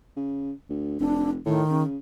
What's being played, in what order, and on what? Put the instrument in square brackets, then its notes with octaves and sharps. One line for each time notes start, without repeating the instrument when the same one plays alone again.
[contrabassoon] C#3
D2
[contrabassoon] F1 [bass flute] D4
[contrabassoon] A2 [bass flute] D#3
[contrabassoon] C#3